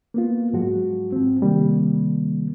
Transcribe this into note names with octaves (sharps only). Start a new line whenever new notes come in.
A#3 B3 F4
G#2 F3 F#3 G#3 F#4
F3 C4
C3 D#3 G3 A#3